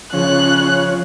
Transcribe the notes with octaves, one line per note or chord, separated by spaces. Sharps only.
C#3 F3 C#4 F#6